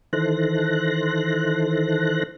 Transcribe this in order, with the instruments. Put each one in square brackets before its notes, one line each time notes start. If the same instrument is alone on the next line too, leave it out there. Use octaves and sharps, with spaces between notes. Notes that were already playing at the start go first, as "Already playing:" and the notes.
[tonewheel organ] D#3 E3 A4 C5 F#6 A#6